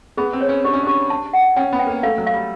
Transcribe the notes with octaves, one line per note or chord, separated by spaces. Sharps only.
B3 G#4
C4
C#5
C#4
D4 G4
C#4
D4 G4
A5
F#5
C#4 G5
B3
G5
A#3
A3 F5
F#3
F5
G3